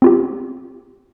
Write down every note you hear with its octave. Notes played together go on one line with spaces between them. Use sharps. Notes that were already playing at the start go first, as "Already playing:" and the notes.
C4 F4 G4